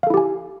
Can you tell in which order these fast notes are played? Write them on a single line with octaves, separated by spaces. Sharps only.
F5 A4 E4 G4 G#5